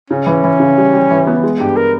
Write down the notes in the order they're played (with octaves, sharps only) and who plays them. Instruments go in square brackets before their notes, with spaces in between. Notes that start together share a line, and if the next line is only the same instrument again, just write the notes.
[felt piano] C#3 [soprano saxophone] C#4
[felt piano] E3
E3
C#3
G3
G3
E3
B3
G#3
[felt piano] G2 [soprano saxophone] G4
[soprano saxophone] A#4